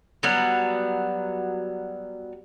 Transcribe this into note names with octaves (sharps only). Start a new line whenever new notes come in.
F#3 G3 B3